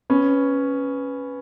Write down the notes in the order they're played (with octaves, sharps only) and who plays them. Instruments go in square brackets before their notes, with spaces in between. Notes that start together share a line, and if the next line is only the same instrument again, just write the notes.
[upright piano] B3 C#4